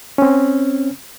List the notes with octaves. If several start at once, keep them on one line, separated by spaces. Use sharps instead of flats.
C4 C#4